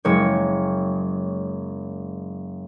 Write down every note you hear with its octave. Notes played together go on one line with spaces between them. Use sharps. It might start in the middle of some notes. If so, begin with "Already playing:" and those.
F#1 G#3 C#5